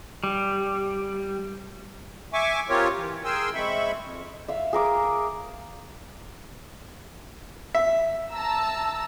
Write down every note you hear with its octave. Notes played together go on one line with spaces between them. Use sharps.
G3
E5 G#5 C#6 D6
C4 F4 G4 A#4 C#5
E3
G#4 A#4 G5 G#5 C6 E6
G#3 C4 E5 B5 C#6
F2
E5 F5
G#4 A#4 D6
E5
A5 A#5 E6